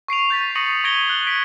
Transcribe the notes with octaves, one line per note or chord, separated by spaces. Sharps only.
C#6 C7 D7 F7
G6 A6 B6
C#6 D#6 A#6 C#7 D#7 F#7
C#6 G#6 A#6 D7 F#7 G7
F#6
B6 D7